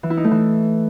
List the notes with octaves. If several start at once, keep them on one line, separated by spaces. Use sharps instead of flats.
E3
E4
D#4
A3
E3